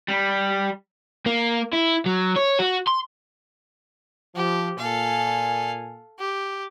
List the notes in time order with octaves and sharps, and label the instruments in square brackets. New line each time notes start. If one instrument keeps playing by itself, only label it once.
[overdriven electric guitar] G3
A#3
E4
F#3
C#5
F#4
C6
[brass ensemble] F3 [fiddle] G4
[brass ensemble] A#2 G#5 [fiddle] A4 F5
[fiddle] G4